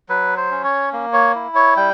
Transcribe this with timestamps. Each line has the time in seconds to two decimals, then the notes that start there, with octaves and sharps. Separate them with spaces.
0.09 F#3 B4
0.37 C5
0.51 C#4
0.64 C#5
0.93 A#3
1.13 C#5
1.35 E4
1.55 C#5
1.76 G3 G5